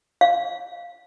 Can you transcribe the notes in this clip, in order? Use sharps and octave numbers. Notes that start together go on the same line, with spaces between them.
F5